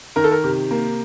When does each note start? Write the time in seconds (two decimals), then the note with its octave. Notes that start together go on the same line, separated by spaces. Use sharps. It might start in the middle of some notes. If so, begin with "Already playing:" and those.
0.16 D#3 A#4
0.24 A4
0.31 A#4
0.44 C3
0.71 A#3